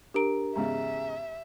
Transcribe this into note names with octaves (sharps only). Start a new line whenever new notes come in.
D4 G4 A#4 A#5 D7
E2 G#2 C#3 E5 A#5